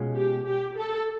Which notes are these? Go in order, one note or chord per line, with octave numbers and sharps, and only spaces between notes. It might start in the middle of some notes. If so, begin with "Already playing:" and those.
Already playing: B2 G#3 C#4 F4
G4
G4
A4